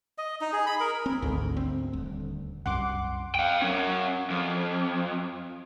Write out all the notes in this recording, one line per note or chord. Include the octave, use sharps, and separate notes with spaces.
D#5
D#4
G#4
B5
A#4
C4
G#1 D2 G#2
C4
D#1
C2 F#2 F#5 C6 D6
F5 G5
F#3 C#4
F2